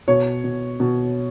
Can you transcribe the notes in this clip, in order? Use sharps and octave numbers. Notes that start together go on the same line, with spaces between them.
B2 C#5
B2
B2